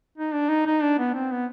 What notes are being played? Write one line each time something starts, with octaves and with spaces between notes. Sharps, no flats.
D#4
D4
D#4
D#4
D4
B3
C4
B3